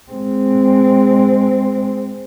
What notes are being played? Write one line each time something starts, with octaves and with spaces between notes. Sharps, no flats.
G#3 C4